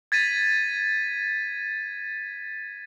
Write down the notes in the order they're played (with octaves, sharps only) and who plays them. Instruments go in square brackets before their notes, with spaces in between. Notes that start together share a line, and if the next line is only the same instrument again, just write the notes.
[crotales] G#6 A6 B6 D#7